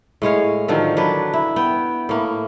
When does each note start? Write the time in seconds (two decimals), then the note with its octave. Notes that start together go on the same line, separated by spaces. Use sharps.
0.22 A2 G#3 C#5 F5
0.68 D3 D#3 F3 F#3
0.97 F#3 D4 B4
1.34 E4
1.56 B3 G5
2.09 A2 A#3